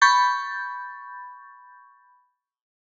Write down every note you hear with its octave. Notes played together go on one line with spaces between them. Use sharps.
B5 C#6 G6 A6